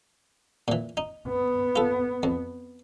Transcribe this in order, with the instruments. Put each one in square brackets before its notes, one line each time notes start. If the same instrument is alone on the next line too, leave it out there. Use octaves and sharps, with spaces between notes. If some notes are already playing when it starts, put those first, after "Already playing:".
[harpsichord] A#2 E3
D#4
[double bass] B3
[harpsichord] F4 A4
F2